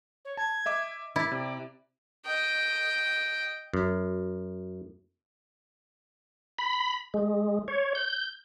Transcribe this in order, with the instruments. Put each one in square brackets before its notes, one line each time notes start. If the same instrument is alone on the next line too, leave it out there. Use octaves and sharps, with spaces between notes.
[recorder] C#5
[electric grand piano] A5 [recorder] G#6
[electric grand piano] D#5 E5 D6
[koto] E4 [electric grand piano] D6 [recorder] A6
[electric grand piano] C3 [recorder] D5
[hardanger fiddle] D#5 G5
[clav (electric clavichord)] F#2
[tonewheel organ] B5
G#3
C#5
G6